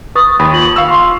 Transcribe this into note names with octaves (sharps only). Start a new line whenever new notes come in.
B4 C#6 D#6 A6
D#2 B5
F4 F#7
F5 C#6 E6
C6